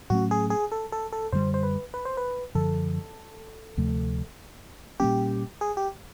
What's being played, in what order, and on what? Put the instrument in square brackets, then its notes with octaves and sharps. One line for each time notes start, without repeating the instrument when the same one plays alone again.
[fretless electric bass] A2 F#3 A3 C#4 [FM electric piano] F#4
[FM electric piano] G#4
G#4
A4
A4
A4
[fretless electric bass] F#2 D3 G3 [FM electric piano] C5
[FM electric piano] C5
B4
B4
C5
B4
[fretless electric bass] F#2 D3 F3 [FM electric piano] A4
[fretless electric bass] D2 C3 F3 A3
[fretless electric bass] A#2 G3 A#3 C#4 [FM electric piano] G4
[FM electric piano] G#4
G4